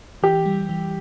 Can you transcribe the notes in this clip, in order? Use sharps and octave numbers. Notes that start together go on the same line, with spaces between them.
E3 G4
G3
E3